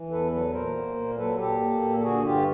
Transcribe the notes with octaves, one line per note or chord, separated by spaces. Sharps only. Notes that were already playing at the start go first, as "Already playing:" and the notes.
Already playing: E3
E2 A4 B4
F#3 A4 B4
A#2 A#4 C5
A#3
A#2
F#3 A4 B4
A#2 G4 A4
A#3
A#2
A4
D3 F#4 G#4
G2 F4 G4